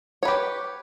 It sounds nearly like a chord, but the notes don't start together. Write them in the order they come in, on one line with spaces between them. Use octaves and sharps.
C#5 B4 G4